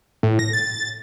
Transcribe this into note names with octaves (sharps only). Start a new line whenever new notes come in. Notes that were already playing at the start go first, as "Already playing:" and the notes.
A2
A#6
A6